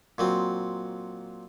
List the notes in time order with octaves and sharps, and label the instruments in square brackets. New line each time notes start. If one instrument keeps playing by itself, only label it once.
[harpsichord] A#2 F#3 C4